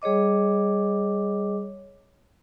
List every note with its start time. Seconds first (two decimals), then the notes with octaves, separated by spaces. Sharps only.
0.02 G3 G#4 C#5 D#5 D6